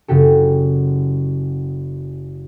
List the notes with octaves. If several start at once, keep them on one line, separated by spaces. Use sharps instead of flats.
F#1 C#3 F#4 G4 A4